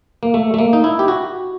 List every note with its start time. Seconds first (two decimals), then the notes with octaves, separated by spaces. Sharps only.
0.23 A#3
0.34 A3
0.54 A3
0.59 A#3
0.73 D#4
0.84 E4
0.99 G4
1.08 F#4